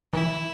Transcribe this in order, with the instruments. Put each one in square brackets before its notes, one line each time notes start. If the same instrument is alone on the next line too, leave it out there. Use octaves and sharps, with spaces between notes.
[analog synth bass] E3 [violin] E4